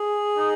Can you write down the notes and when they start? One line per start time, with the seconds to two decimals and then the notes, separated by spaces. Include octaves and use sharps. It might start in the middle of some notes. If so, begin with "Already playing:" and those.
Already playing: G#4
0.38 D#4